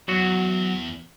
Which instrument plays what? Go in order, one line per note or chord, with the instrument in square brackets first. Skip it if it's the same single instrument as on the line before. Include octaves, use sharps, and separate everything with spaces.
[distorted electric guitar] E2 [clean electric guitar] F#3 F#4